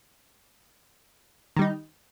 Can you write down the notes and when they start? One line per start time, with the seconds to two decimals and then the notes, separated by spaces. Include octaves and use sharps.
1.56 D#3
1.59 G3
1.62 D#4